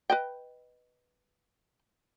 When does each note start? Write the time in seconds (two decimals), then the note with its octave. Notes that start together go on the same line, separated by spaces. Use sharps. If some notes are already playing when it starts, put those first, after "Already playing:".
0.10 B4 D#5 G5